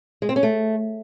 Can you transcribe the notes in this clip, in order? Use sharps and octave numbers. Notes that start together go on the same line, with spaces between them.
G#3
C4
C#4
A3